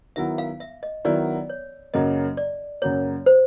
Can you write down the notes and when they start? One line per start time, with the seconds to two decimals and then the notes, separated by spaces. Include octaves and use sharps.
0.16 D#3 F#3 B3 E4 E5
0.38 F5
0.60 E5
0.83 D#5
1.05 D#3 F#3 B3 E4 D5
1.49 C#5
1.94 F#2 C#3 F#3 A#3 D#5
2.37 D5
2.82 F#2 C#3 F#3 A#3 C#5
3.26 C5